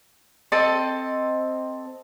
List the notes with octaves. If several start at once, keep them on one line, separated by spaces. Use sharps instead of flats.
C4 A4 D#5